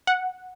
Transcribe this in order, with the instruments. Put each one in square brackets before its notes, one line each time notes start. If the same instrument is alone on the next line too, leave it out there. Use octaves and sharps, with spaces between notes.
[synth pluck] F#5